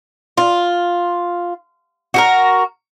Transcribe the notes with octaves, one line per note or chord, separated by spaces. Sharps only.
F4
F#4 G4 A#4